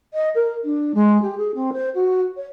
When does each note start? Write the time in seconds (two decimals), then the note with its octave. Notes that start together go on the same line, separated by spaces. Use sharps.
0.14 D#5
0.35 A#4
0.64 D4
0.94 G#3
1.22 G4
1.38 G#4
1.55 C4
1.73 C5
1.95 F#4
2.37 C#5